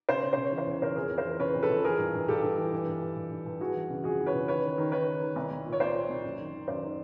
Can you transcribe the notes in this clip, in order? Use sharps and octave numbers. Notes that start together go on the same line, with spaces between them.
C#3 C5
C#3 C#5
C#3 C5
C#5
E3
C5
E2 C#5
C#3 A#4 C5
F2 G#4 A#4
F2
A#4 C5
E3
C#3 B4 C#5
F2
A4 B4
F2
E3 G#4 A#4
G2
G2
G2 G4 A4
G2
E3
G2
G2
G2
G2
G2
G2
E3 F#4 G#4
E3
C#3
F2 F#4 G#4
E3
B4 C#5
C#3
D#3 B4 C#5
D#3
D#3
D#3 B4 C#5
D#3
D#3
C2
C2
A#2
C#5
A#2 C5 D5
A#2
C2
F#2
D#3
D#3
F#2 C5 D5
D#3